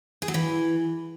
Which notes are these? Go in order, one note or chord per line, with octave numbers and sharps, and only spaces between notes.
G#4
F#3
E3